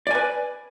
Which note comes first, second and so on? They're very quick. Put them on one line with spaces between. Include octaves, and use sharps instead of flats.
D5 G#5 B4